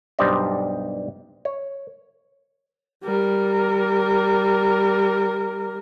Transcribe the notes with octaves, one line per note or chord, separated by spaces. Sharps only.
B1 G2 G3 C5 D5 D#5
C#5
G3 A#4